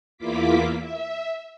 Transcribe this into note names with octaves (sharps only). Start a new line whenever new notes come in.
E2 A#3 E4 F4 D6 B6
E5